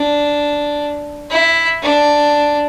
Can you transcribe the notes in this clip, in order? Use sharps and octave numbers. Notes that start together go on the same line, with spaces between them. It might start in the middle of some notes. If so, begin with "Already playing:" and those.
Already playing: D4
E4
D4